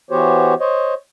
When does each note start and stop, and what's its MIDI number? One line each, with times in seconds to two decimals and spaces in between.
0.11 0.54 52
0.11 0.54 59
0.11 0.54 66
0.11 0.54 67
0.11 0.54 72
0.11 0.54 73
0.60 0.94 72
0.60 0.94 73
0.60 0.94 75